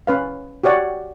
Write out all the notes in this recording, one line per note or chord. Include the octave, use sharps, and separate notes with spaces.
C#4 B4 F5
F#4 G4 C#5 D5 F#5